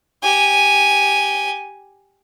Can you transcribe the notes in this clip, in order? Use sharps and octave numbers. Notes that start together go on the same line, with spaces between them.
G4 G#5